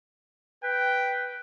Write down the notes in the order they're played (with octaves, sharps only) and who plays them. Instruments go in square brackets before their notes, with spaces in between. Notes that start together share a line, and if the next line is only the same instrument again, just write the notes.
[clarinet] B4 [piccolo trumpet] G5